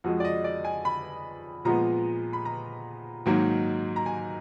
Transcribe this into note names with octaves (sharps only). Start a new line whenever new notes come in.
F2 F3 G#3 F#4
D5
D#5
D5
G#5
B5
A#2 F3 G#3 B3 A#5
B5
A#5
G#2 D#3 F#3 A#3
A#5
G#5